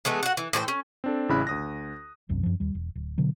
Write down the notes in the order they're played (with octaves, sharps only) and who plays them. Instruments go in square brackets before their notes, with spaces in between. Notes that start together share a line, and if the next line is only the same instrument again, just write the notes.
[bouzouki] E3 G#3 A3 B3
F#4 F#5
E3
A2 E3 C5 G5
C#4
[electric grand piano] C4 D4 A4
A1 C#3 E4 B5 F#6
D2 D#6 A#6
[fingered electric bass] E1 C2 F#2 C3
F#2 F3
D#2 G3
E1
D1
B2 D3 F#3